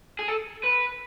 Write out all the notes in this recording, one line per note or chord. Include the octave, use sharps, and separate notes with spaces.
G#4
A4
B4